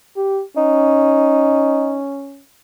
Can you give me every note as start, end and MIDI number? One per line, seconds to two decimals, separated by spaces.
0.16 0.41 67
0.57 2.42 61
0.57 1.98 63